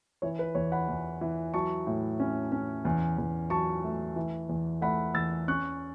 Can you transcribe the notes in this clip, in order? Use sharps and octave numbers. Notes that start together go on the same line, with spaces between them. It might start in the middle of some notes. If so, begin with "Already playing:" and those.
E3 C#5
B4
E2 C#5
F#5 B5
E2
E3
F#3 A5 C#6
A2
C#4
C#4
E2
E2
F#3 A5 C#6
A3
E3
E2
A3 F#5 B5
E2 E6 A6
C#4 C#6 F#6